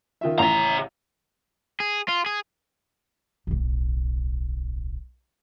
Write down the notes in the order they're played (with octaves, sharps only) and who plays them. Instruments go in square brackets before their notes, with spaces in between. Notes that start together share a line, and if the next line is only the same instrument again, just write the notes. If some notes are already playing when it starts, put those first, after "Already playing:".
[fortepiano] D#3 F4 E5
[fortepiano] A1 [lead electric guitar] C#3 A#5
[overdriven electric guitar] G#4
F4
G#4
[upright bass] D1 B1